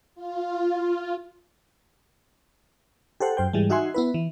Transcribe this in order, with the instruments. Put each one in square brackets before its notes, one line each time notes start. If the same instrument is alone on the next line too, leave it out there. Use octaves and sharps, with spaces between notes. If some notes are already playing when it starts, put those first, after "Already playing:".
[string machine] F4
[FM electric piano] G4 A4 C5 F#5
F#2 C5 G5
G#2 E3 G3 G#3
D#4 F#4 E5 F#5 G#5 C6
B3 E4 B4
E3